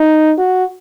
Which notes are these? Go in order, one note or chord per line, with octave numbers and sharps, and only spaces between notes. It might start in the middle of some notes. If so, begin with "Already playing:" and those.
Already playing: D#4
F#4